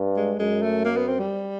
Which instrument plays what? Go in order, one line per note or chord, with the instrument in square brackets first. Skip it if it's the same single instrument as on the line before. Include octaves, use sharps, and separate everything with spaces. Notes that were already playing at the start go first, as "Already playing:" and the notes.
Already playing: [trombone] G2
[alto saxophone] G#3
[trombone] F#2 [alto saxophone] G#3
[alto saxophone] A3
A#3
B3
C4
G3